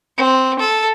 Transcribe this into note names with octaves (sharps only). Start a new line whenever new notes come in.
C4
A4